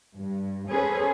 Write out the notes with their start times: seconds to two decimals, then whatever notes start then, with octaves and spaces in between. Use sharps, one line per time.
0.17 G2
0.70 C#4 G#4 A4 B4 C5